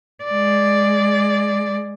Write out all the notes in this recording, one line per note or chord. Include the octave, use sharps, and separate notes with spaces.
G#3 D5